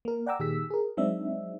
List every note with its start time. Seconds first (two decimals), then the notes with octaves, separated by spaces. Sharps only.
0.05 A#3 A#4
0.26 D5 F#5 G5 A#5 D6 E6
0.39 A#2 D#3 G4 G#4 E6 B6
0.70 G#4 A#4
0.97 F#3 G#3 C4 D4 D#4 E5